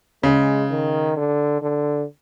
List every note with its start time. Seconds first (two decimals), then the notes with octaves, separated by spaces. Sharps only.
0.23 C#3 G#3
0.70 D#3
1.16 D3
1.62 D3